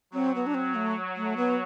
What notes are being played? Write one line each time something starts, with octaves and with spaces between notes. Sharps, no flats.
F#3 C4
B3
D4
C4
A3
A3
B3